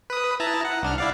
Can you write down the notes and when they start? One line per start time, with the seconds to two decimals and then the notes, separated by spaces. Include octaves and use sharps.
0.10 B4 D#6
0.40 E4 A5 A#5
0.65 F#5
0.82 C2 D4 F6
0.98 E4 D5 F5